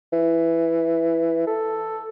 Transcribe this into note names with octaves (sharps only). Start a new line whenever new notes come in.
E3
A4